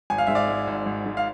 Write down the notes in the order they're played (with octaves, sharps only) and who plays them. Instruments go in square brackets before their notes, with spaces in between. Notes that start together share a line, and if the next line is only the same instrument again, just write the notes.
[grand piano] G#1 G#5
F5
G#2 E5
D5 F5
G#3
G#1
G#1
G#2
F5